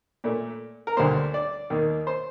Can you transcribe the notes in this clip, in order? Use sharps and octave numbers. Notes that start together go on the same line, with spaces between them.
A#2 A3
A#4
D2 D3 G3 A#3 C5
D5
D#2 D#3 A#3
C5